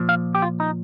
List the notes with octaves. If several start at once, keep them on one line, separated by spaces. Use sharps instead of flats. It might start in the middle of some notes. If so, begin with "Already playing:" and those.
Already playing: A#2 F3
F5
G4
F4
D#4